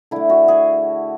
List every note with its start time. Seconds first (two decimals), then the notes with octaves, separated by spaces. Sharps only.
0.11 D3 A3 E4
0.29 F#4
0.48 G#4